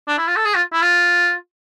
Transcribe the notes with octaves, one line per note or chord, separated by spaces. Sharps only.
D4
E4
F4
A4
G#4
F4
E4
F4